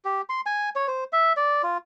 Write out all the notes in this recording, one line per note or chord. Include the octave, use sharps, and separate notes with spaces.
G4
C6
G#5
C#5
C5
E5
D5
F4